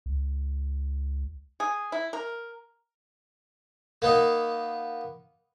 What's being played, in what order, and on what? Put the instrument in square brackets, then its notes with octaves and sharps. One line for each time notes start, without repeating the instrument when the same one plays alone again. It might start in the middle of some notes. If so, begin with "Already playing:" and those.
[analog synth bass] C#2
[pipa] G#4
E4
A#4
[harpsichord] A#3 B3 D#4